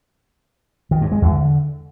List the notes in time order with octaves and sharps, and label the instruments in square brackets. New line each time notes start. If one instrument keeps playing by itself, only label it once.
[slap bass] D#3
G2
G#3
E2
D3